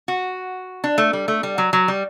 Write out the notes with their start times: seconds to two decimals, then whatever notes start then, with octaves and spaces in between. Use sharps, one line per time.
0.08 F#4
0.84 D4
0.98 A3
1.13 G3
1.28 A3
1.43 G3
1.58 F#3
1.73 F#3
1.88 G3